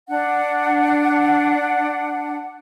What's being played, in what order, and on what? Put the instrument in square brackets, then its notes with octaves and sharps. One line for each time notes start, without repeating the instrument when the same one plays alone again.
[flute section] D4 F#5